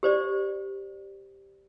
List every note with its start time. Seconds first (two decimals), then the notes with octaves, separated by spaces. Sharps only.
0.03 G4 C5 D5